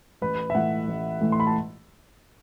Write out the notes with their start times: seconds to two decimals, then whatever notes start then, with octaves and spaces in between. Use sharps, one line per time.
0.22 A1 B4
0.50 E5
0.55 A2 E3 A3 F#5
0.88 A1
1.21 A2 E3 A3
1.32 C6
1.40 B5
1.47 A5